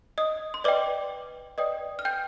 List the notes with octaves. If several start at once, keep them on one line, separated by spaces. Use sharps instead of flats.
D#5 D#6
C6
B4 D5 D#5 G5 D6
B4 D5 D#5 G5 D#6
F6
G5 G6